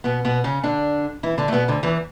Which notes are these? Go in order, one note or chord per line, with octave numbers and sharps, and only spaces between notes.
B2 B3
B2 B3
C#3 C#4
D3 D4
E3 E4
D3 D4
A3
B2 B3
D2 D3
E2 E3